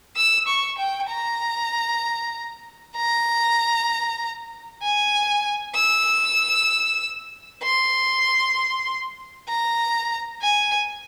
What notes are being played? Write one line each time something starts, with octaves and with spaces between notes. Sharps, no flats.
E6
C#6
G5
A#5
A#5
G#5
E6
C6
A#5
G#5